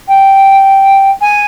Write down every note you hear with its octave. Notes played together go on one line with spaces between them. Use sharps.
G5
G#5